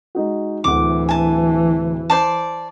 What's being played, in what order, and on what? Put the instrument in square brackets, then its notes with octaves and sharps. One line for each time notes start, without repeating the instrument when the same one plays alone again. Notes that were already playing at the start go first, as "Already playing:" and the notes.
[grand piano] G#3 D#4 F#4
[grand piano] D1 D2 F#5 [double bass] E3 [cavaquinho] D6
[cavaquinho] G#5 A5
C5 D5 A5